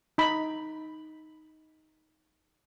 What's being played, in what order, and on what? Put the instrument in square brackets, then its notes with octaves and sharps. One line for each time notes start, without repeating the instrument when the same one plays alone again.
[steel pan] D#4 B5